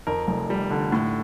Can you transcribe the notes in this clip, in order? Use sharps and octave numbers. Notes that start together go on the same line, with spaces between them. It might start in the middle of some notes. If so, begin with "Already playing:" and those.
F2 A#4
F1
G3
D3
A2